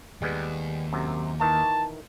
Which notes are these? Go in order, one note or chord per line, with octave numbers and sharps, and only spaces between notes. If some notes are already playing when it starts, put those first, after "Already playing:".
D#2 G3 G#3 B3
F#2 C3
D#3 E3 A5